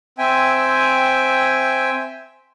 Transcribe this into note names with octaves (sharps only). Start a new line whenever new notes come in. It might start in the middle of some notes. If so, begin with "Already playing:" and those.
C4 E5 G5 G#5